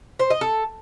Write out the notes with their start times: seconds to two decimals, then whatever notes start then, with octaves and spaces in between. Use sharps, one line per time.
0.19 C5
0.30 D#5
0.41 A4